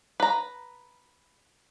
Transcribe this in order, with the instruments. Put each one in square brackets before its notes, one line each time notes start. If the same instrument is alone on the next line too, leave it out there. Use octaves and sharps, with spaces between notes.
[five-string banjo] B4 A#5